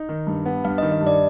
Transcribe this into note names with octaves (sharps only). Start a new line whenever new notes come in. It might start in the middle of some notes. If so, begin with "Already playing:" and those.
Already playing: D#4
D#3
G2
B3
G2 F5
D#5
D#3
D#5
G2
D5